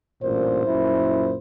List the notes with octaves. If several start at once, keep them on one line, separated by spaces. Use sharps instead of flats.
A1 G2 A#2 C5
F#2 A#2 E4